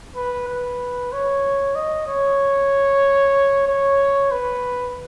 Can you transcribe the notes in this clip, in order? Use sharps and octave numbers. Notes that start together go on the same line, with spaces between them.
B4
B4
C#5
D#5
C#5
C#5
B4